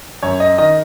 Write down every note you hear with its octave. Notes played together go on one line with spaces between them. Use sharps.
F#2 C#5
D#5
D#3 D#5